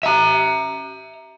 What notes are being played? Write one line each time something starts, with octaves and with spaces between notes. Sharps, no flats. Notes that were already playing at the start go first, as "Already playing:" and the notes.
E5 A#5